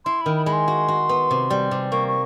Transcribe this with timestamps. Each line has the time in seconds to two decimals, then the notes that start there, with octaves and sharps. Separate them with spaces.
0.05 E4 C6
0.21 D#3 B5
0.36 B5
0.46 G#3 B5
0.53 C6
0.68 F#4
0.88 F#4
1.09 B3
1.31 C3
1.50 G3
1.71 C3
1.92 A#3 C#6
2.08 C#6